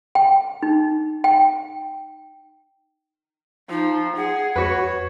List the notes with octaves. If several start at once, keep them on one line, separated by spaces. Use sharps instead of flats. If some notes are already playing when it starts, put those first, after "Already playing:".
G5
D#4
G5
F3 D#4
G#4 F#5
F2 F#4 B4 C#5